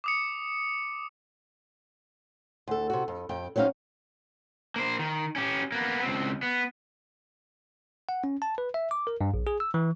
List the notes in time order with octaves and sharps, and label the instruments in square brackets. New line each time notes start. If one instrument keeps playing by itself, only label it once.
[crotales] D6 D#6 C#7
[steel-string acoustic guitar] D2 A4
C3 F#4
F2
F2 G5
F#3 C4 C#4 D#4 F5
[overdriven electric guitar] A#3 C5
D#3
C#4 G4
A#3 B3
C#2 C4
B3
[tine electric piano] F#5
C#4
A5
B4
E5
D6
A#4
G2
A#1
G#4
E6
E3